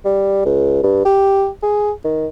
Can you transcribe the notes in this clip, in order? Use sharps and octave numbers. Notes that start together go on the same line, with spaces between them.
G3
C#2
G2
G4
G#4
D#3